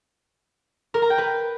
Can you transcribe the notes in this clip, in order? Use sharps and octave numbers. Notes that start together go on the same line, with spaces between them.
A#4
A#5
G5
B4